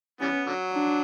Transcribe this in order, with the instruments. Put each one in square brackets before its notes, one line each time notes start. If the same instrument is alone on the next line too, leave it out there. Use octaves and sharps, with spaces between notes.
[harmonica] E3 G3 B3 [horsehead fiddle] C#4
[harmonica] D3 F#3
[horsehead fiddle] D4